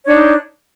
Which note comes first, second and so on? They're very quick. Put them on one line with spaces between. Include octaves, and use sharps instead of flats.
C#5 D4 D#4